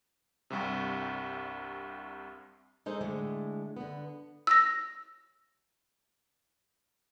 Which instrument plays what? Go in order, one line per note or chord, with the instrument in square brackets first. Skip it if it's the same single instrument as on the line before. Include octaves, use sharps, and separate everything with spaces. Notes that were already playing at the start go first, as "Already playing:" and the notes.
[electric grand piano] C2 G2 C3
[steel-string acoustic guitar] G#3 D#4 A4 C5
A2 D3 G#3 A3
D3 B3
[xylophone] E6 A#6